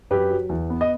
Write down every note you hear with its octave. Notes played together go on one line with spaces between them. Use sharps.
F#2 G4 B4
F#3
E2
B3
D#5